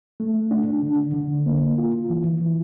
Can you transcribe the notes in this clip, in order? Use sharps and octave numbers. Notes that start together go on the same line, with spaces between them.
A3
D4
D3
D3
A#3
F4
E3
E3